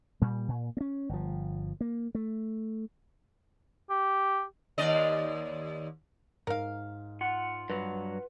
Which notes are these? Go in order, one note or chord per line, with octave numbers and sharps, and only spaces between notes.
A#2 G3
A#2
B3 C#4
G1 F3
A#3
A3
G4
D#2 D5 D#5
G#2 A#4 F5
F4 F#5
G2 F#3 B4